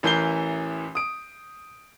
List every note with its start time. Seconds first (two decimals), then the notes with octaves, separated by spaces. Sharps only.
0.03 A1 E3 A#4 G6 C7 G7
0.95 D#6 D7